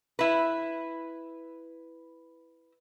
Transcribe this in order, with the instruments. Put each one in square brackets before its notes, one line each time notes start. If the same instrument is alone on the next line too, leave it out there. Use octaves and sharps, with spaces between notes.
[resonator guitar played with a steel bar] E4 B4